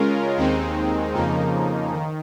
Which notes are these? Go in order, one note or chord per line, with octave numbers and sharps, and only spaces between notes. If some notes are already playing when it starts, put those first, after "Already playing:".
Already playing: C#3 G#3 C#4 F4 A#4
D#2 D#3 G#3 C4 D#4
F2 C#3 F3 A#3 D#4
D#3